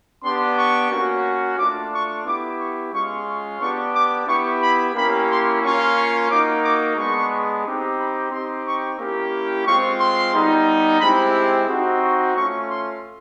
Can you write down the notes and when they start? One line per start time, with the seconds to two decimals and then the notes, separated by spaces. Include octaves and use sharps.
0.24 B3 D4 G4 C6
0.57 C#6
0.91 A#3 C#4 F#4
1.58 A3 D4 F4 D6
1.93 C#6
2.25 B3 E4 G4 D6
2.60 C#6
2.93 G#3 C#4 F4 C#6
3.28 C#6
3.60 B3 D4 G4 C#6
3.94 D6
4.27 B3 E4 G4 C#6
4.61 B5
4.95 A#3 C#4 E4 G4 B5
5.29 C6
5.62 A#3 C#4 F4 C#6
5.96 C#6
6.30 A#3 D#4 F#4 D6
6.64 D6
6.97 G#3 B3 D4 C#6
7.64 C4 D#4 G4
7.98 B5
8.31 C4 D#4 G4 C6
8.65 C#6
8.99 A#3 C#4 E4 G4
9.66 G#3 C4 F4 C#6
10.00 C6
10.34 G3 B3 D#4
11.00 G#3 C4 E4 G4 B5
11.68 C4 D#4 F#4
12.03 C#6
12.36 A3 C#4 F4 C#6
12.69 C6